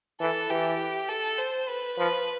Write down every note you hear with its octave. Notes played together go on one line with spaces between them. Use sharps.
E3 A4
E3 G4
A4
C5
B4
F3 B4